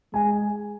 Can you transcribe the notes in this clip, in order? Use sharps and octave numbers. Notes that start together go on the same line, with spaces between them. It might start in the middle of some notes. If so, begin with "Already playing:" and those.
G#3 G#5